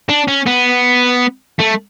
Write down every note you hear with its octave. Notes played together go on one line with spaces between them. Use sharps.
D4
C#4
B3
A3